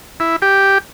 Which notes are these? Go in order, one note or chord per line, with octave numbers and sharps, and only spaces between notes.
E4
G4